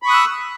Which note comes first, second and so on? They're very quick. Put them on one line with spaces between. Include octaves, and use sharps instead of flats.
B5 C#6 D#6 F#6 E6